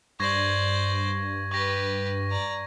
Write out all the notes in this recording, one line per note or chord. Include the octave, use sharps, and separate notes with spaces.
G2 C5 D5 C#6 G#6 A#6
G4 B4 C#6 A#6
D5 A#5